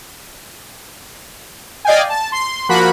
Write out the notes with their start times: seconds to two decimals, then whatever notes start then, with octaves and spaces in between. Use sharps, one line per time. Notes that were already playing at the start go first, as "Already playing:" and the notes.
1.85 D5 D#5 F5 G5 G#5
2.09 A5
2.32 C6
2.69 F3 A#3 F#4 B5 F#6